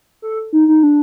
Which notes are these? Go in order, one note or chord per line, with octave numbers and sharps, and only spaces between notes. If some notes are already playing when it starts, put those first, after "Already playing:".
A4
D#4
D#4
D4